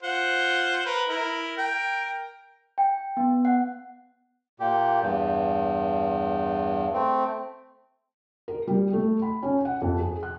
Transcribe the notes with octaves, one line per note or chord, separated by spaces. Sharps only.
F4 C5 F#5
A#4 B4
E4 A#4
A#4 G5
G5
B3
F#5
A#2 G4
E2 G2
A3 C4
A#4
G3
A3
B5
C#4
F#5
F2
G#4
F#6